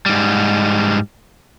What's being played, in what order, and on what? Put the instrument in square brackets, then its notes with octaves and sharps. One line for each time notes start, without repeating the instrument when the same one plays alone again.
[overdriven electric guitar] G#2 G3